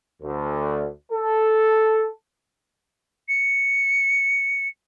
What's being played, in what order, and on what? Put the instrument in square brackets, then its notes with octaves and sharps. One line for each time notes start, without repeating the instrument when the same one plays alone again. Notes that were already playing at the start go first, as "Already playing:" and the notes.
[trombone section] D2
A4
[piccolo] C#7